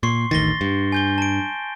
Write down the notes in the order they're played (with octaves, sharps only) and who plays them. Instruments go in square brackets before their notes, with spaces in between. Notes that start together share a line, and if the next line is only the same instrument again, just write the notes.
[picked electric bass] A#2 [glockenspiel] C6 C#6 C7
[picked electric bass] A1 D2 D#3 [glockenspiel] A6 A#6 G7
[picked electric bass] G2
[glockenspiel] G#5 G6 G7
A5 D7